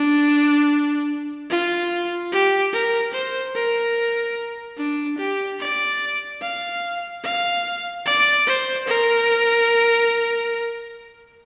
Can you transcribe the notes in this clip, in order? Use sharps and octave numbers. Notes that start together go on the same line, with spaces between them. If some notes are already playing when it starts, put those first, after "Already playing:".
Already playing: D4
F4
G4
A#4
C5
A#4
D4
G4
D5
F5
F5
D5
C5
A#4